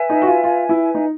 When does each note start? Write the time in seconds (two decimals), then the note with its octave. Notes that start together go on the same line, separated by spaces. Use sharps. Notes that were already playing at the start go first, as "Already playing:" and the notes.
Already playing: B4 E5 G#5
0.09 D#4
0.22 F#4
0.27 F4
0.44 F4
0.69 E4
0.95 D#4